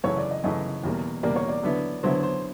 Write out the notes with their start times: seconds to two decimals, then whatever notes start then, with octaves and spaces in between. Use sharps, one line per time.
0.04 F#2 C#3 E3 A3 C#5
0.17 D5
0.31 D#5
0.44 F#2 C#3 E3 A3 D#5
0.84 E2 B2 G3 A#3
1.23 E2 B2 G3 A#3 D5
1.36 C#5
1.49 D5
1.63 D3 F#3 B3 E4
2.03 D3 F#3 B3 E4 C5
2.23 C5